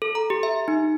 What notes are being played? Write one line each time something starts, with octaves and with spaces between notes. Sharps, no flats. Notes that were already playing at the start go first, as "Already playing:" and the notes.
A4
A#5
G4
E5
D#4